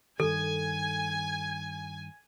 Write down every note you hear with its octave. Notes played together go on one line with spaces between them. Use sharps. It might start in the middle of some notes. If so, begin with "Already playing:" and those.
G2 D#3 A4 G#5